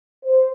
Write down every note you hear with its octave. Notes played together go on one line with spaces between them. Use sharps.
C5